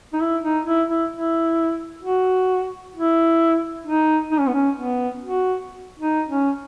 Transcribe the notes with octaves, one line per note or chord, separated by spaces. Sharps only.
D#4
E4
D#4
E4
E4
E4
F#4
E4
D#4
D#4
C#4
B3
C#4
B3
F#4
D#4
C#4